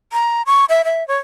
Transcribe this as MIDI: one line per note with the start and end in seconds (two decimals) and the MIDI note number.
0.12 0.42 82
0.46 0.65 85
0.69 0.82 76
0.85 1.06 76
1.08 1.16 73